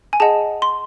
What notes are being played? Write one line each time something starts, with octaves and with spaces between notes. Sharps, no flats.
G#5
G#4 D#5 F#5 A5
C6